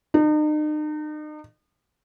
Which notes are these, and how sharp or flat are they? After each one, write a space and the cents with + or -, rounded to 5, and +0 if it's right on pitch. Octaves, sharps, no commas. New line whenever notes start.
D#4 -40